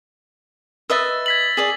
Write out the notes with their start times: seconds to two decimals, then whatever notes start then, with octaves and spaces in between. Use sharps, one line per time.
0.90 B4 D#5 E5 E6 A6
1.26 G#6 B6 F#7
1.57 G#4 D5 F#7